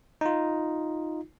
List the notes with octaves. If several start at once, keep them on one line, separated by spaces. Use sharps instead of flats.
D#4 F4